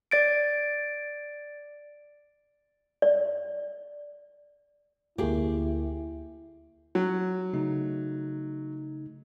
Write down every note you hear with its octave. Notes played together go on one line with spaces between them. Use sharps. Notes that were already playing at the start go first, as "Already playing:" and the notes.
D5 A6 D7
D5
D2 A#3 E4 G4 G#4
F#3
C#3 A3 D#4